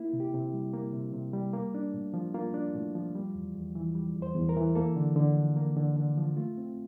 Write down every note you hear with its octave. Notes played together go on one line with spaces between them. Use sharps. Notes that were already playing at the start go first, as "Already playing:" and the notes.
Already playing: A#3 E4
C3
G4
C3
G3
A#3
C3
C3
G3
A#3
D4
A2
F3
A#3 F4
D4
A2
F3
G3
E2
E2
E3
G3
E2
C5
E2
A#4
E3
A#3 A4
D3
D3
F3
A#3
D3
D3
F3
A3 F4
C4